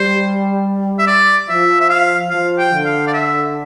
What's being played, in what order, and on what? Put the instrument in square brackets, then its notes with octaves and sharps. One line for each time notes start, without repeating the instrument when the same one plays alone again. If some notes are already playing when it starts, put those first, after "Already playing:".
Already playing: [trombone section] G3 [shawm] C5
[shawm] E5
D5
[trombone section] F3 [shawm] E5
[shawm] E5
F5
[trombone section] F3 [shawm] F5
[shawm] G5
[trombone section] D3
[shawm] F5
D5
E5